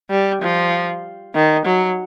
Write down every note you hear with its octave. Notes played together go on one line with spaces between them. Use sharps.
G3
F3
D#3
F#3